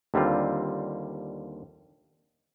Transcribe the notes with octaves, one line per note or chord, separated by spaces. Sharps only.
D#2 D3 G3 C4 F4